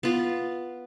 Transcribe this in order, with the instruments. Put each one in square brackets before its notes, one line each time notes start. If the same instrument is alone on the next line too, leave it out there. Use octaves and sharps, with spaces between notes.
[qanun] B3 F4